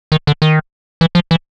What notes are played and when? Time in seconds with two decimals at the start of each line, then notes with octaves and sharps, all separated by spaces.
0.12 D#3
0.27 D3
0.42 D#3
1.01 E3
1.15 F3
1.31 E3